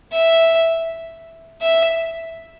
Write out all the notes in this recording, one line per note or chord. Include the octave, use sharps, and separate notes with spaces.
E5
E5